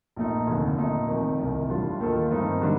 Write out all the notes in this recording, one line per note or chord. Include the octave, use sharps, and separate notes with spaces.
A#1 A#2 A3 D#4
F1 D#2 D3
A#1 A#2 A3 D#4
F1 F2 D#3
C2 C3 D#3
A1 A2 G3 D4 F4
D#2 D#3 A#3 F4 A4
G2 D#3 A3 C4 D#4
D3 G3 A#3 D4